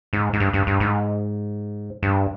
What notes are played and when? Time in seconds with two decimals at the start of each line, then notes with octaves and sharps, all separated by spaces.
0.13 G#2
0.33 G#2
0.40 G2
0.53 G2
0.67 G2
0.80 G#2
2.03 G2